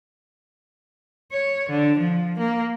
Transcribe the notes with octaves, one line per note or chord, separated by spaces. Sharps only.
C#5
D3
F3
A#3